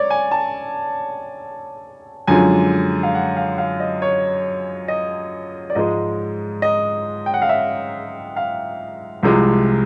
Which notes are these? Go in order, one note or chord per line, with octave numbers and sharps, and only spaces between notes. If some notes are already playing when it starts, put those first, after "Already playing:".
Already playing: C#5 D5
G#5
A5
F#2 D3 F3 G#3 G#5
F5
F#5
F5
F5
D#5
C#5
D#5
D5
G#2 F3 G#3 D#5
D#5
G5
F#5
F5
E5
F5
C2 C3 F3 G#3